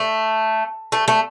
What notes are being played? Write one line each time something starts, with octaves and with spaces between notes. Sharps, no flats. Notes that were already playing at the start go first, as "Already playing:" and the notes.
Already playing: A3
A3
A3